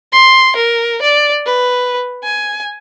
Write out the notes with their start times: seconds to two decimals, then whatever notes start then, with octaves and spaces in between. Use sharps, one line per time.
0.12 C6
0.56 A#4
1.02 D5
1.46 B4
2.24 G#5